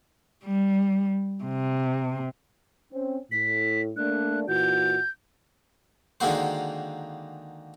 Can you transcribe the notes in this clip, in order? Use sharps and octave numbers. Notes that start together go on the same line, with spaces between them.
G3
C3
C4 C#4
A2 B6
A3 A#3 D4 F#6
A#2 E3 F#4 G6
D3 D#3 G#3 A#3 F#4 C5